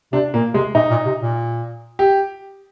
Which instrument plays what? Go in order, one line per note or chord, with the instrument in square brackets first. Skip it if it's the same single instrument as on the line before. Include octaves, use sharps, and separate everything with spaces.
[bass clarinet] C3 [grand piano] D4
[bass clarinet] A#2 [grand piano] A#3
[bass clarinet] C3 [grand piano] G#3
[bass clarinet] A#2 [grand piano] D#4
[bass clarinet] A#2
C3
A#2
[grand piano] G4